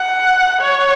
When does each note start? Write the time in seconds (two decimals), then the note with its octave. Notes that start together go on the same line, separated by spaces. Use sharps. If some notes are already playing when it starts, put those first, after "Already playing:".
Already playing: F#5
0.61 C#5